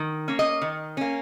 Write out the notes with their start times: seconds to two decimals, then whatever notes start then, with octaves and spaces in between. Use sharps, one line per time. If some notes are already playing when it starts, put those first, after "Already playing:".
Already playing: D#3
0.28 A#3 C#4
0.39 D#5
0.62 D#3
0.97 A#3 C#4